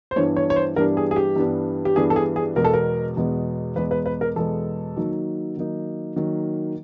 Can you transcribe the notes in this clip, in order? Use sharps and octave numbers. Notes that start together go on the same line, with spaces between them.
C5
G2 E3 G3 B3 D4 C#5
C#5
C#5
C5
G2 E3 G3 B3 D4 A#4
G#4
G#4
G4
G2 E3 G3 B3 D4
G4
G2 E3 G3 B3 D4 G#4
A4
G#4
G#4
E2 B2 G#3 B3 A#4
A4
A#4
E2 B2 G#3 B3
E2 B2 G#3 B3 B4
B4
B4
A#4
E2 B2 G#3 B3 A4
D#3 F#3 A#3 D#4
D#3 F#3 A#3 D#4
D#3 F#3 A#3 D#4